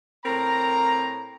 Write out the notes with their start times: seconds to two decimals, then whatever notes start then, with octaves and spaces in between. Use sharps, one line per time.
0.25 A2 C4 A#4 A#5